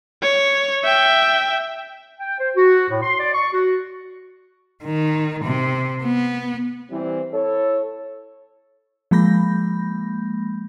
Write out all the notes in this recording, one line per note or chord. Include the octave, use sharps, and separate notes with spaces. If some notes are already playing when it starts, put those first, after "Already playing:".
C#5
E5 G5
G5
C5
F#4
A2
C6
D5
C#6
F#4
D#3
C3
B3
E3 G3 C4 E4
E4 A4 C#5
F3 G#3 A#3 B5 G6 A#6